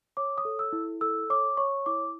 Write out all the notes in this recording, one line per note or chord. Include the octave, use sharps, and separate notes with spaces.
C#5 D6
D#6
A4
E6
E4
A4 E6
C#5 D6
C#5 C#6
E4 D6